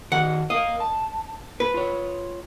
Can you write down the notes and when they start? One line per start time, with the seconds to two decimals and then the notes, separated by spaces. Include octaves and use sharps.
0.12 D#3 F#4 D#5 F#5
0.50 A#4 D#5 F5
0.80 A5
1.60 B4
1.74 F4 C#5